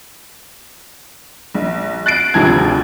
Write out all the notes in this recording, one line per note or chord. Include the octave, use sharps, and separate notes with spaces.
A#1
F#6 A6 C7 D7
G#1 D2 C3 F3 A5 G#6